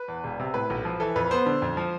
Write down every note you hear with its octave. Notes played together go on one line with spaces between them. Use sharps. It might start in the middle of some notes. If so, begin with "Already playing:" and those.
Already playing: B4
E2
E1
C3
A2 B4
B1
F3
E3 A4
F2 B4
B3 C5
D3
F2
F3